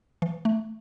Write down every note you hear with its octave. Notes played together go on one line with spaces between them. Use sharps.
E3
A3